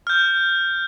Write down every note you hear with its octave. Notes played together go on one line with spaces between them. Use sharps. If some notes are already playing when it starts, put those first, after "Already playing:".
F6 G6